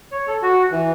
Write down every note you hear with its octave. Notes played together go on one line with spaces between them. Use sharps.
C#5
A4
F#4
E3